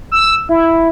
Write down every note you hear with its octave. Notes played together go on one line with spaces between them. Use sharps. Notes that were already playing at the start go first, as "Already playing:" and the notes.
E6
E4